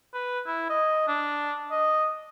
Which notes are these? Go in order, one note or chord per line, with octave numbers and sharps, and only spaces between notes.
B4
E4
D#5
D4
D#5